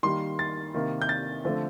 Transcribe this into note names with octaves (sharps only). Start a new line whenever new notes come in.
D#3 G3 A#3 C6
A6
C3 D#3 A#3
G6
A6
D3 F3 A3 C4